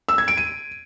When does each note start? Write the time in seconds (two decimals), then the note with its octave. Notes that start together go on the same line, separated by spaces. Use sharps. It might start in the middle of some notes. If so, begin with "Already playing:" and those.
0.09 E6
0.18 G#6
0.28 D7
0.37 D#7